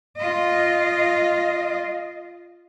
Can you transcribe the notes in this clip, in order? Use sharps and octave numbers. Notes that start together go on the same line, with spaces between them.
F4 D#5